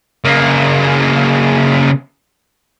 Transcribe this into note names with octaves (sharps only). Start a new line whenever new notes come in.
C#3 A#3